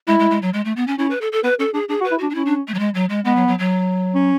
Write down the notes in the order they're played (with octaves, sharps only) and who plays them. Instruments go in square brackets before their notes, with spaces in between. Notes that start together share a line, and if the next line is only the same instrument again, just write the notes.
[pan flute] G#3 [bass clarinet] E4
[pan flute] G#3
G#3
F#3
G#3
A3
B3
C#4
[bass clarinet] C#4 [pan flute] E4
[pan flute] B4
A4
A4
[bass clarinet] B3 [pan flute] B4
[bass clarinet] C#4 [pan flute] A4
[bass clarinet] D4 [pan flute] G#4
[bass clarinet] D4 [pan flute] G#4
[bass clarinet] F#4
[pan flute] B4
[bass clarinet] E4
[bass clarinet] D4 [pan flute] F#4
[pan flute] D4
[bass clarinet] C#4 [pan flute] E4
[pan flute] D4
A3
F#3
G#3
F#3
G#3
[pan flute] G#3 [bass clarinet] B3
[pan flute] F#3
F#3
F#3
[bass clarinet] C#4